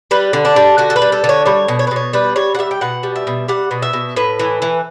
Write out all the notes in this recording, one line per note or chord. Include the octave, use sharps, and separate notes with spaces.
G3 B4
D3
D4
G3
D3 F#4
A4
B4
G3
A4
D3
C#5
G3 C#5
B2
C#5
B4
B2 C#5
G3 B4
G3 C#5
F#5
G3 E5
G5
B2 F#5
G3
E5
B2
G3 F#5
B2
E5
B2
A2 B4
E3
E3